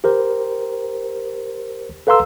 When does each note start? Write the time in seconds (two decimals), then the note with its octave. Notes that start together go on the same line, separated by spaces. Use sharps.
0.04 G4 A#4 C5
2.07 A4 B4 F5 A#5 C6 E6